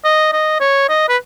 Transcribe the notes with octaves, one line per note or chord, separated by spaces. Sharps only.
D#5
D#5
C#5
D#5
B4